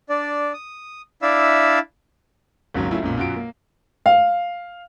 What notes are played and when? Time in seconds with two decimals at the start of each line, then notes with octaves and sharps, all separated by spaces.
0.09 D4 D5
0.54 D#6
1.22 D4 E4 D5 E5 F5 E6
2.74 G#1 D#2 G#2 C#3 F#3
2.91 F#3 A3 C#4 E4 F4
3.02 B1 F#2 A#2
3.17 F#2 B2 F4 F#4 D7
3.36 A#3
4.06 F5